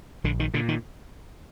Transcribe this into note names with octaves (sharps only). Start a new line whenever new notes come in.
A#1 D3
D#3
A#2 D3
D#3